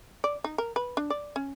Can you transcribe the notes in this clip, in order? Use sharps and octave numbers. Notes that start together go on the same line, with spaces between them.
D5
D#4
A#4
B4
D4
D5
C#4